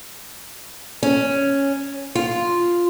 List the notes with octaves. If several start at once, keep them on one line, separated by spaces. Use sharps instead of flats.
C#4
F4